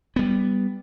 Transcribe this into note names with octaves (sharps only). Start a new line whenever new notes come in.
G3 B3